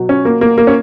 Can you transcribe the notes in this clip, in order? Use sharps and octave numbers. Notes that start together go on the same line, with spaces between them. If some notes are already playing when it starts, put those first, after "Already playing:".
Already playing: B2 F#3
C#4
A#3
A#3
A#3
C#4